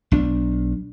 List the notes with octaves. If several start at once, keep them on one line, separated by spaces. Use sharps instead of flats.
B1 D4